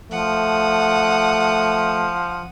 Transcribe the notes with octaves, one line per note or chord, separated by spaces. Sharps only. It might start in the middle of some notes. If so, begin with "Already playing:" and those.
F3 A3 F#5 D#6